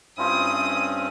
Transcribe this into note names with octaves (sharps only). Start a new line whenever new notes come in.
G2 C4 C#4 E4 F4 C5 D#6